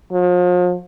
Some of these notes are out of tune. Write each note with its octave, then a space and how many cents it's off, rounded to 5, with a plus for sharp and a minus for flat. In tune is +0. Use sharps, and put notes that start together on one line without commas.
F3 +40